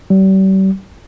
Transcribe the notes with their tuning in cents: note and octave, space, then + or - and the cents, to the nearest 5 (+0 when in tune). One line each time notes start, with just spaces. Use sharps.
G3 -40